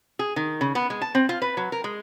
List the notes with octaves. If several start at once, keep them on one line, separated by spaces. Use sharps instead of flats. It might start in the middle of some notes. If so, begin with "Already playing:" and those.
G#4
D#3
C#3
B3
G#3
A5
C4
F4
B4
F#3
A#4
G#3